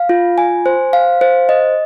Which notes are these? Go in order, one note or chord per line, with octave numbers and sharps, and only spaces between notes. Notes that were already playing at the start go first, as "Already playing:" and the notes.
Already playing: F5
F4
G#5
C5
F5
C5
D#5